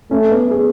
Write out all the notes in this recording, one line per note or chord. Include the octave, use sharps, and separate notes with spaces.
A3 C#4
B3
G#4